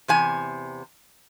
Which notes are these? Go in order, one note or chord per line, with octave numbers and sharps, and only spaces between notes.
E2 C3 G#5